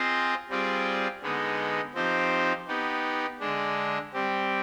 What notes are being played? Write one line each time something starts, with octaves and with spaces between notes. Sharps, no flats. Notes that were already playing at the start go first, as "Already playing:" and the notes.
Already playing: C4 F4 G#4 C5 D#5
G3 C4 F4 G#4 D5
D3 G#3 B3 D#4
F3 C4 D#4 G4 C5
B3 D#4 G4
D3 G#3 D4
G3 C4 G4